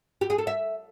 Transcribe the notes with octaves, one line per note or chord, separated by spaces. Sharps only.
G4
G#4
A4
E5